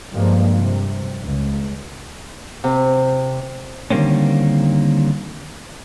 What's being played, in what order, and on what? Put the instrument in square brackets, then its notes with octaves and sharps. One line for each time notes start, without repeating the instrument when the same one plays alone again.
[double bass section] G2 F3 G#3 A#3
C3
C#2
[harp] C3
[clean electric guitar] D3 D#3 G3 A#3 C4 C#4